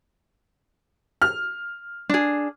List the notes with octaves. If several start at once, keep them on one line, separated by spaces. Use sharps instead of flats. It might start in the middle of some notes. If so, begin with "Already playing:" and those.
F6
D4 G#4